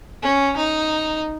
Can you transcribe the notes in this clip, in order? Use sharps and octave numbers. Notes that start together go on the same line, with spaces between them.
C#4
D#4